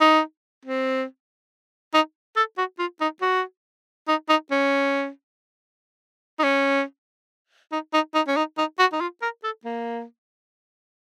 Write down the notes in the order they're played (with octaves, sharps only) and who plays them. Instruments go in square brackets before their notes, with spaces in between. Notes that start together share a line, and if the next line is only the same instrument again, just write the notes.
[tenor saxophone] D#4
C4
D#4
A4
F#4
F4
D#4
F#4
D#4
D#4
C#4
D#4
C#4
D#4
D#4
D#4
C#4
D#4
D#4
F#4
D#4
F4
A#4
A4
A#3